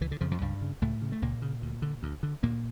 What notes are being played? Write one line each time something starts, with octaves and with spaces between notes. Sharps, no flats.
C#2 E3
D3
F2 C#3 F3
F2 F3
C#2 G2 G3
C#3
C#2 A2 A3
C#3
A3
C#2 A#2 A#3
C#3
D2
D3
D2
D3
D2 A#2 A#3